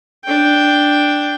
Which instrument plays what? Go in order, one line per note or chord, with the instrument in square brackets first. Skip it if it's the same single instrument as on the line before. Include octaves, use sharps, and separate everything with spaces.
[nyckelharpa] D4 G5